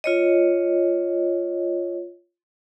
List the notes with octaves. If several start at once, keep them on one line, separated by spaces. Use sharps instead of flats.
F4 C#5 D#5